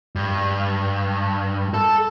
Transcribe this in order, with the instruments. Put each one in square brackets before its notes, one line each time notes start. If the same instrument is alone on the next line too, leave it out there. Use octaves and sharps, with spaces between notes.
[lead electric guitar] G2
A4 A5